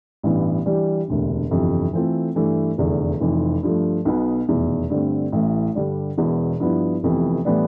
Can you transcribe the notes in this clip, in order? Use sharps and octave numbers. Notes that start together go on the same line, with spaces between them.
A1 G2 E3 B3
E3 G3 D4 G4
E1 D2 C3
G1 F2 C3 E3
E3 A3 C4 F4 A4
G2 E3 A3
F1 E2 D3
F1 F2 E3
G2 F3 A3
B1 B2 B3
F1 E2 B2
G2 D3 A3 C4
A1 A2 E3
G2 D3 G3 D4
E1 E2 B2 B3
G2 F3 B3 E4
F1 F2 C3 E3 B3
A2 E3 G3 B3 D4